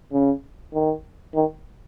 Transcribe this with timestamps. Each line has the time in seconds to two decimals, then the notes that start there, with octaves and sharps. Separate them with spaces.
0.13 C#3
0.73 D#3
1.35 D#3